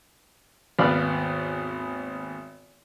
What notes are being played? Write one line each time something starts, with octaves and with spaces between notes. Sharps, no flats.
G#1 D#2 B3 D5 F5